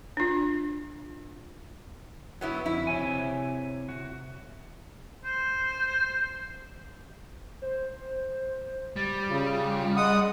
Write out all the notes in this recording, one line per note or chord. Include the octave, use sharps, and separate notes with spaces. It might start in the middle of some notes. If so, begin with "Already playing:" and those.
D4 F4
F#3 B3 E4
F2 E4
C3 C#5 G#5
F#4
C5
C5
G3 A6
C#3 F4
G#3 D#5 F#5 D#6